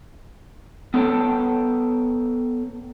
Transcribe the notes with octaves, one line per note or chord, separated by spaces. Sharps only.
B3 D4 A4 C#5 G5 A5